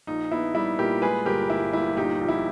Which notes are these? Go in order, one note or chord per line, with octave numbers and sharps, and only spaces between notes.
A#1 D#4
B3 E4
G3 E4
A#2 G4 A#4
G#3 G#4 B4
G1 G4 A#4
G1 E4
G1 E4
A#2 D#4 G4
A#1
E4